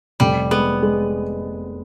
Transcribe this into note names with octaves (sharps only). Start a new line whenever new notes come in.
F1 G3
G#3 B3
G#3